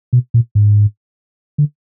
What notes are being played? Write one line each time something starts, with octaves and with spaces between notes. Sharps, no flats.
B2
A#2
G#2
D3